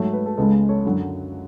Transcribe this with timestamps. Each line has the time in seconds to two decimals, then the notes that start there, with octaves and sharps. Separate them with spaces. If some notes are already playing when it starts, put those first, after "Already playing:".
Already playing: G#2 F#3 A3 C#5 E5
0.13 B4
0.26 A4
0.37 C#2 C#3 G#3 B3 A4
0.53 A4
0.69 A4 C#5
0.85 F#2 D3 F#3